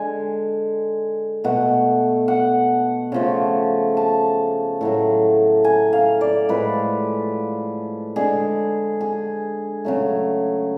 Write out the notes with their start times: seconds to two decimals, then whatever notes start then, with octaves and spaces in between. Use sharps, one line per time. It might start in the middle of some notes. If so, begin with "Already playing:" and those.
Already playing: D3 G#3 G#5
1.44 B2 A3 F#5
2.28 F#5
3.12 C#3 F3 A3
3.97 A5
4.81 A2 F#3 A3
5.64 G#5
5.93 F5
6.21 D5
6.49 A2 F3 G#3 B4
8.16 D3 G#3 G#4
9.01 G#4
9.85 C#3 F#3 A3